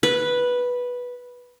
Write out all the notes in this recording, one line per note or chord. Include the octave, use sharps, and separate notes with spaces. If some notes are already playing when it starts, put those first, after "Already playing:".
B4